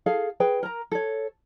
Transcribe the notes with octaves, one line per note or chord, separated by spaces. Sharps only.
G#4 A4 F5
G#4 B4 G5
A#4 A#5
A4 C#5